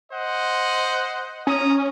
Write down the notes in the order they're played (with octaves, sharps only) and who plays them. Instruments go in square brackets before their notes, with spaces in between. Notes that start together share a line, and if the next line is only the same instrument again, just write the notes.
[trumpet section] C5 D#5 F#5
[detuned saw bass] C#4 [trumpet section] A#5 D#6